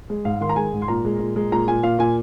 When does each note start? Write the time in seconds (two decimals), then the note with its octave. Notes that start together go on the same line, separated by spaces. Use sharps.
0.10 G#3
0.25 G#2 F5
0.41 D#3 C6
0.49 A#5
0.56 G#3 G#5
0.73 G#2
0.82 C6
0.88 A#2 A#5
1.05 G#3
1.19 A#2
1.36 G#3
1.52 A#2 A#5
1.68 A#2 G#5
1.83 A#2 F5
1.99 A#2 G#5